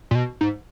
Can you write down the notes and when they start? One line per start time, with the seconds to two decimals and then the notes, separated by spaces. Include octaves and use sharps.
0.11 A#2
0.15 B2
0.41 G#2